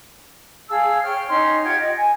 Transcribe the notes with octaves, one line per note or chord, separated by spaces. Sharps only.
G#4 F5 A5 E6
C#5 G5 F6
C#4 D#4 C6
F4 G4 F#5 G#6
D#5
G#5